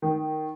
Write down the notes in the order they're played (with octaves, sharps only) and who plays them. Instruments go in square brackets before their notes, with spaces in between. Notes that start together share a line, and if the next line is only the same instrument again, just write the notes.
[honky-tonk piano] D#3